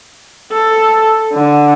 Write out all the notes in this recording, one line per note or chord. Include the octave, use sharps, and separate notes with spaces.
A4
D3